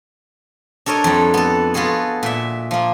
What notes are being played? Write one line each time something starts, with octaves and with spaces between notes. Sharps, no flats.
D4 A4 A#4 C#5 D#5
F2 G3
B3 A4
B3 F4 F#4 G#4 A4
A#2 E5
F3 A#3